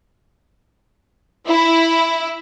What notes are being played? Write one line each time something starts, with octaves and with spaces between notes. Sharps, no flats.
E4